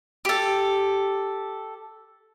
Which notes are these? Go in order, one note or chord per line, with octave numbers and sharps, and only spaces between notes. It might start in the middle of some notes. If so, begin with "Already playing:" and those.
G4 A4